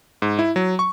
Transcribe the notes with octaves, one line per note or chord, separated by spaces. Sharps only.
G#2
E4
F#3
C#6